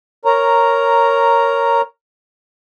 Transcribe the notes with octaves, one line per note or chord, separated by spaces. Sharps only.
A#4 C#5 A#5